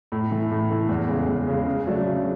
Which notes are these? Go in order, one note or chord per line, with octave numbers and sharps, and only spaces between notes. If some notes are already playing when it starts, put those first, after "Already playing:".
A2
E3 A3
A2
E3 A3
E2
C#3 G#3
E2
C#3 G#3
C#3
F#3 A3 D4
C#3